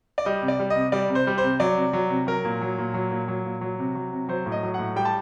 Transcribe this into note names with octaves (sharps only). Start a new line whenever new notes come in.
D5
G3 D#5
C3
D5
G3
D#5
C3
G3 D5
C3
C5
G3
C5
C3
F#3 D5
C3
F#3
C3
F#3 A#4
A#2
F#3
A#2
F#3
A#2
F#3
A#2
F#3
C3
F#3
C3
F#3 C5
A2
D#5
F#3
A2 F#5
G3 G5
A5